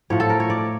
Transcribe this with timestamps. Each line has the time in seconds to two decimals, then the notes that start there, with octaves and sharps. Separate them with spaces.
0.10 A2 F3 C#5
0.20 A4
0.30 A#4
0.40 C#5
0.50 D5